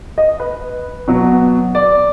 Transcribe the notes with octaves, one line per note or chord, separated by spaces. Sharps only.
D#5
B4
B2 F#3
D5